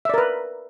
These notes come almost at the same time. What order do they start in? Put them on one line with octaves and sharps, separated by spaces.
E5 D5 A#4 B4